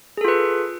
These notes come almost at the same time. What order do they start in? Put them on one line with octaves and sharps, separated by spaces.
G#4 A4 F4 B4